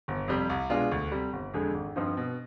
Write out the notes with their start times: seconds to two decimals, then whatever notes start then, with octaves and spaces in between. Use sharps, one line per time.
0.08 G1
0.28 F2 C3 G3
0.49 C2
0.70 B2 G#3 D4 F4
0.91 D2
1.12 C3 G3
1.33 G1
1.54 F2 D3 G#3
1.74 G#1
1.96 G2 F3 C4 D#4
2.17 B2